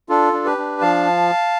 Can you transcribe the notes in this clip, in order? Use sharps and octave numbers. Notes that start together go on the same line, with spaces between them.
D4 F4 A4
D4
G4 B4
D4
F3 F5 A5